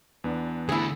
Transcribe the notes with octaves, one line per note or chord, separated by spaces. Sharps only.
E2 B3 D4
D3 A3 E4 G#4